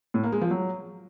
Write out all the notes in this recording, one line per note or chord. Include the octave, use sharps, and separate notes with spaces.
A2
A#3
G#3
F3
F#3